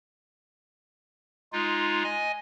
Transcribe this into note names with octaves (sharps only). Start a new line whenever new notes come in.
G#3 D#4 F4
D#5 G#5